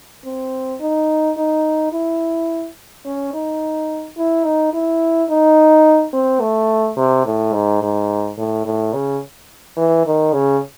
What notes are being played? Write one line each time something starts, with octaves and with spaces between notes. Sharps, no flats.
C4
D#4
D#4
E4
C#4
D#4
E4
D#4
E4
D#4
C4
A3
C3
A2
G#2
G#2
A2
A2
C#3
E3
D#3
C#3